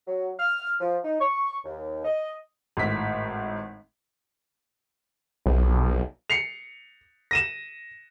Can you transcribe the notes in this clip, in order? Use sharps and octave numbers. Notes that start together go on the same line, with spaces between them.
F#3
F6
F3
D#4
C#6
D#2
D#5
G#1 A2 B6
B1
C7 C#7 F7
A#6 D#7 E7